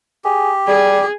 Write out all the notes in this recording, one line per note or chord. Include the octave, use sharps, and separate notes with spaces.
G4 G#4
G3 G#4